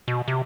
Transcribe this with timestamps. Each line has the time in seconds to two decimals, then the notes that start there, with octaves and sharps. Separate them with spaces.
0.08 B2
0.28 C3